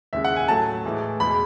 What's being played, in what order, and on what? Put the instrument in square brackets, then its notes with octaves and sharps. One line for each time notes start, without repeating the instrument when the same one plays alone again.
[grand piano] D#2 C#3 G#3 E5
F#5
G#5
A2 F#3 A3 A5
A2 E3 G#3
E2 B2 G#3 B5